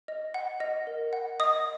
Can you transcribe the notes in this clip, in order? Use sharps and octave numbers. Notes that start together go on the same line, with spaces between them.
D#5
F#5
D#5
A#4
F#5
D#5 D#6